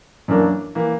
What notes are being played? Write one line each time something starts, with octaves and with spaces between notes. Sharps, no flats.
F#2 E3 A#3 D4 A#4
E3 A#3